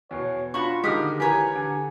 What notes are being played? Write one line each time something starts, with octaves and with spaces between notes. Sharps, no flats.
E2 B2 C#5
D4 F4 F#4 B5 C#6
D3 D#3 G#3 G4 D#6 F6
E3 G4 A#4 C#5 G#5
D3 G#5